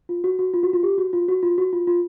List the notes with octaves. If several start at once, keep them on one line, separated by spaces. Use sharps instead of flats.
F4
F#4
F#4
F4
F#4
F4
G4
F#4
F4
F#4
F4
F#4
F4
F4